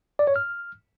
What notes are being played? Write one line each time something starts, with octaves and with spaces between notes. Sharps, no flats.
D5
C#5
F6